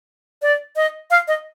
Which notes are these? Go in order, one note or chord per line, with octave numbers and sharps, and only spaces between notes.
D5
D#5
F5
D#5